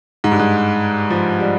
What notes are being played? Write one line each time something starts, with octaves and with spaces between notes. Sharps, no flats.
G#2
G2
G#2
F3
G3